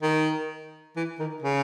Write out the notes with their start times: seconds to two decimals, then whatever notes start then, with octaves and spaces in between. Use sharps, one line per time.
0.02 D#3
0.96 E3
1.19 D#3
1.42 C#3